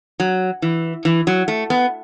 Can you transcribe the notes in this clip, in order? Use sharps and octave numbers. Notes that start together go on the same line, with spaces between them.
F#3
E3
E3
F#3
A3
B3